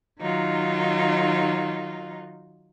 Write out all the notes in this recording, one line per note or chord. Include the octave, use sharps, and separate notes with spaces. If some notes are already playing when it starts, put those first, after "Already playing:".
D#3 F#3 D#4 F4